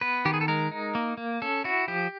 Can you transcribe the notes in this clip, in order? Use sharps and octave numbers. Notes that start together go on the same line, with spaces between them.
B3 B4
D#3 G4
G#4
A4
G#3 A#4
D#4
A#3
A#3
C#4 A4
E4 F#4
F3 G4